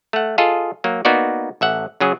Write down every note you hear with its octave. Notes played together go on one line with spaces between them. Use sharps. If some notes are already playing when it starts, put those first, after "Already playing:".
A3 F#5
F4 G#4 A4 D#5 F5
F#3 A#3
A#3 B3 D#4 F#4 D5
A1 E5 F#5
C#3 F#3 G#4